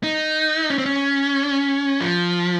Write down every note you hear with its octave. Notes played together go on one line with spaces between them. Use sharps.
D#4
C#4
C4
C#4
F3